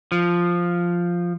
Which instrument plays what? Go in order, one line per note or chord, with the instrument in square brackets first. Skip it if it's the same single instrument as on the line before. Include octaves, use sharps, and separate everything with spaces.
[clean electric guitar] F3